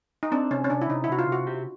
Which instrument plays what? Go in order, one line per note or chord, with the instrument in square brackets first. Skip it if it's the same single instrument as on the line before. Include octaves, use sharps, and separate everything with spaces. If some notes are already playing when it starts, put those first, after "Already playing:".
[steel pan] D#4
[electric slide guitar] C4 [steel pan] D4
[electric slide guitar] C3 [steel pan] C#4
[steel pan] C#4
[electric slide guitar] C3 [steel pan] D4
[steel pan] E4
[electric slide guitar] C3 [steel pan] D#4
[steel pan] E4
[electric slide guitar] C3 [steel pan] F#4
[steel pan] F4
[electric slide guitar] C3
[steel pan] F#4
[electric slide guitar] G4